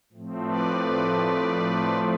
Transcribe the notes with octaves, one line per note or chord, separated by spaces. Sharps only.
A2 F3 A3 C4
B4 D5